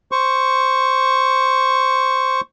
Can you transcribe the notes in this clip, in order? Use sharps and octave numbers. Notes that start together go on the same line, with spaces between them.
C5 C#6